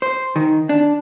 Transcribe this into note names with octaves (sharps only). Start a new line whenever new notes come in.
C5
D#3
D4